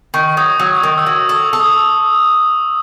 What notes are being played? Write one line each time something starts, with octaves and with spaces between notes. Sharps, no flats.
D#3 C#6
F#3 D#6
F#3
D#6
D#3
E6
F#3
A4 D#6
A4
D#6